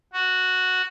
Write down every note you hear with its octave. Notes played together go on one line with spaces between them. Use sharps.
F#4